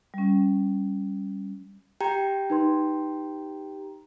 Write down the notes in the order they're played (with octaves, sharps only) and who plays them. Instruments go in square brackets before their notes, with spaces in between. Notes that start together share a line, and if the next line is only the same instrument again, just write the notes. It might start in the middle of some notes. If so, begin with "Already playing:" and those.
[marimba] G3 C#4
[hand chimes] G4 G5 A#5
[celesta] D#4 B4 C6